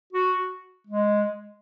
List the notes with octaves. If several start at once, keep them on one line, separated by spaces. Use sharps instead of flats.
F#4
G#3